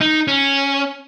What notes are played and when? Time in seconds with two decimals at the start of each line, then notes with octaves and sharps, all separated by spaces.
0.01 D#4
0.28 C#4